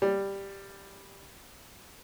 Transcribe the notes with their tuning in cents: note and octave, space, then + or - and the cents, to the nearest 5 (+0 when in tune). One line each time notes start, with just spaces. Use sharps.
G3 +5